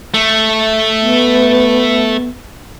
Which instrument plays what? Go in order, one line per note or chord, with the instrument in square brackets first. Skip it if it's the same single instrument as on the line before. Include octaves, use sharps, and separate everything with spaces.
[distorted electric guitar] A3
[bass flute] B3